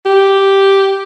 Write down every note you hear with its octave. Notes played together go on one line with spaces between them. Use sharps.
G4